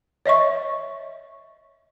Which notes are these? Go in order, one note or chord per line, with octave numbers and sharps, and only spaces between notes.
C#5 D#5 E5 C#6